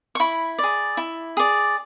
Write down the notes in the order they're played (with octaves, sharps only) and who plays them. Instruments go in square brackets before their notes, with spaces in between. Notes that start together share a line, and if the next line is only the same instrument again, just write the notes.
[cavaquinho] C#6
E4 B5
G#4 D5
E4
G#4 D5